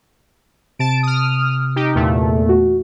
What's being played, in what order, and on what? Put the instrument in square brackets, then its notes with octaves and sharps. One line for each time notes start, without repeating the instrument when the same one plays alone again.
[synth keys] C3 [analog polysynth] A5 D7
[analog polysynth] D#6 F6
D#4 G4
E2 A#2 A3
[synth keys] F#4